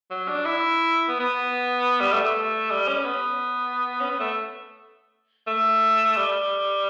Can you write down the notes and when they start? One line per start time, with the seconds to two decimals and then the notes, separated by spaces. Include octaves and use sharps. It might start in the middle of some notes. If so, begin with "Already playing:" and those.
0.10 F#3
0.28 D4
0.45 E4
1.08 B3
1.20 B3
2.00 G3
2.13 A3
2.24 A3
2.70 G3
2.88 C#4
3.05 B3
4.00 C#4
4.09 B3
4.20 A3
5.47 A3
6.16 G3